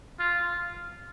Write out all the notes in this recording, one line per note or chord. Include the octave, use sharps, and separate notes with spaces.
F4